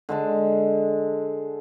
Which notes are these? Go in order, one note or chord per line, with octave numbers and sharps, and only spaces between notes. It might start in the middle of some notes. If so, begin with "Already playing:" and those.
D3 G#3 A5